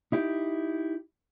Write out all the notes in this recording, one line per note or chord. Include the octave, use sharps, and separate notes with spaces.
D#4 E4 G4